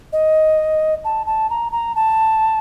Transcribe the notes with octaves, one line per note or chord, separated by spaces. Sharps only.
D#5
A5
A5
A#5
A#5
A5